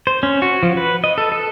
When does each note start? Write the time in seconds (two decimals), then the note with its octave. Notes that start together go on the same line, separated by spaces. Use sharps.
0.07 C5
0.23 C#4
0.42 F#4
0.63 F3
0.77 B4
1.04 D#5
1.18 A4
1.32 A4